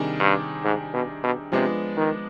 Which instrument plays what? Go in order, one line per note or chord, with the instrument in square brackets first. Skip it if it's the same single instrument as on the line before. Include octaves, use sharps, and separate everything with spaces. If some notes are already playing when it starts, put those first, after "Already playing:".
Already playing: [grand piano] C3 D#3 G3 D4 G#4
[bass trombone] G2
G#2
B2
B2
[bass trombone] C3 [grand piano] F3 G#3 B3 D4
[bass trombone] D#3